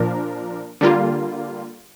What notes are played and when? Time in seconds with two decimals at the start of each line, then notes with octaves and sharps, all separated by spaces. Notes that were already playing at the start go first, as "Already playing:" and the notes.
Already playing: A#2 F3 D4 A#4
0.81 D3 G3 A#3 F4